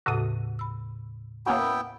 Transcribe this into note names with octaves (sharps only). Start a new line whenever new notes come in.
D#2 A2 C#3 F#4 A4 D#6
B5 E6
A#3 B3 C#4 E4 F#4 G5